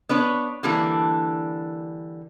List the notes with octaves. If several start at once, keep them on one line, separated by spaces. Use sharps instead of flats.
B3 D4 B4 C#5
D3 E3 G3 A#3 D4